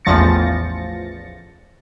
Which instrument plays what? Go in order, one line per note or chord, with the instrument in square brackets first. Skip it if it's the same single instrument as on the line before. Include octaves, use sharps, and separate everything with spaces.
[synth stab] A1 E2 F3 A6 A#6 C#7